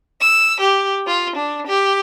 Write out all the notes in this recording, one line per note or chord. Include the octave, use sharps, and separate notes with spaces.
E6
G4
F4
D4
G4